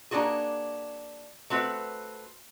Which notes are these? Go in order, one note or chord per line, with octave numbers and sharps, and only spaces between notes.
A#3 D4 E4 F#4 G#4
A3 C4 F#4 B4